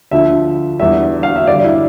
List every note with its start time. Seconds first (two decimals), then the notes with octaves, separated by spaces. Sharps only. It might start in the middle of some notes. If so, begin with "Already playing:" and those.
0.11 D2 D3 F3 E5
0.80 E2 D3 G3 E5
1.23 F5
1.36 E5
1.47 G2 D3 G3 D5
1.64 E4